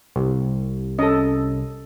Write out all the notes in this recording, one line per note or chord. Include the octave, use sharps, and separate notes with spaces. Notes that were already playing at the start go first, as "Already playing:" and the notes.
C2
C#4 A4 D#5